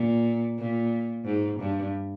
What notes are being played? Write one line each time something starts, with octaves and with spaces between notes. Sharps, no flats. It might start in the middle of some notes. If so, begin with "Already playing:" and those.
Already playing: A#2
A#2
G#2
G2